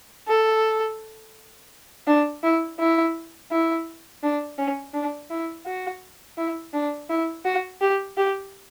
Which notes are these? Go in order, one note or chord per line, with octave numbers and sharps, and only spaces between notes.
A4
D4
E4
E4
E4
D4
C#4
D4
E4
F#4
E4
D4
E4
F#4
G4
G4